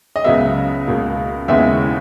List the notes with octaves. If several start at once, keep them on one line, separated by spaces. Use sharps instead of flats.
D#5
C#2 C#3 F#3 B3 E5
C#2 B2 A#3
D#2 C#3 G#3 B3 E4 E5